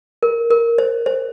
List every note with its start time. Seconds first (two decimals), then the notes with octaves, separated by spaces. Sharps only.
0.23 A#4
0.50 A#4
0.78 C5
1.06 C5